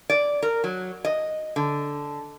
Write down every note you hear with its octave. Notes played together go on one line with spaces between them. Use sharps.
D5
A#4
F#3
D#5
D3